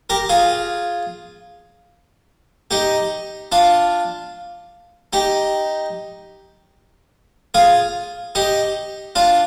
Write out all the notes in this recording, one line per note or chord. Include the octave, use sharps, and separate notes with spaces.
G4 A#4
F4 G#4
D#4 G4
D4 F4
D#4 G4
F4 G#4
D#4 G4
D4 F4